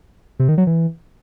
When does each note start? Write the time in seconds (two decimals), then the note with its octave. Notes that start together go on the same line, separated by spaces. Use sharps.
0.39 C3
0.49 D#3
0.58 F#3
0.67 E3